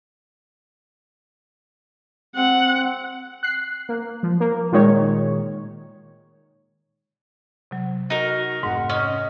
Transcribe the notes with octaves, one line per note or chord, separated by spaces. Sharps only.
C4 F#5
F#6 C7
A#3
F3
A#3
A#2 D#3 G#3 C#5
C3 F#3
D#4 F#4 A#4
F1 G#2 F#5
C#4 D#5